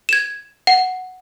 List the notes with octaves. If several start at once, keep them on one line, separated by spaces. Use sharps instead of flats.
G#6 E7
F#5